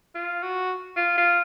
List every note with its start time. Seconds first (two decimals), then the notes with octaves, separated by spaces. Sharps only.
0.15 F4
0.43 F#4
0.96 F4
1.18 F4